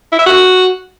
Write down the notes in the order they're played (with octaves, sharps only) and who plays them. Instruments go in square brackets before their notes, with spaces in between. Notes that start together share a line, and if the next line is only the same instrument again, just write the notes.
[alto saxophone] E4
E5
F#4